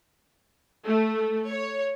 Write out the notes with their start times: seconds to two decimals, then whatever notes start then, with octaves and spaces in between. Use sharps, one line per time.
0.84 A3
1.50 C#5